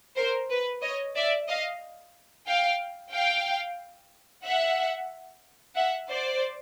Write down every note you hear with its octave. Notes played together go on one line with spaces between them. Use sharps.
A#4 C5
B4
C#5 D#5
D5 E5
D#5 F5
F5 G5
F5 G5
E5 F#5
E5 F#5
C5 D5